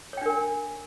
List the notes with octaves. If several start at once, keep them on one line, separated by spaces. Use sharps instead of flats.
D4 A#4 C#5 G5 G#5